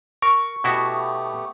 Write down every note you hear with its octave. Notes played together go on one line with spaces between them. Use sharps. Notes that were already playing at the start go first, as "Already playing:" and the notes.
A#4 C#6
B2 A3 B3 E4 F#4 G4